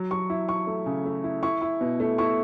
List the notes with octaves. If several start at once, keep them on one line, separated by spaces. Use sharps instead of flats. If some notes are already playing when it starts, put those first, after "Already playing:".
Already playing: F#3
F#3 C#6
E4
E4 C#6
A3
C#3
A3
E4
E4 C#6
E4
B2
A3
E4 C#6